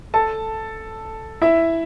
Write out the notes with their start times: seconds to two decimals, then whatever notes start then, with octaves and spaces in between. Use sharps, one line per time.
0.14 A4 A5
1.42 E4 E5